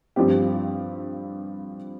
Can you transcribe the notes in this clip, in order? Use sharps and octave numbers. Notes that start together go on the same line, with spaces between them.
G2 F3 C4 G4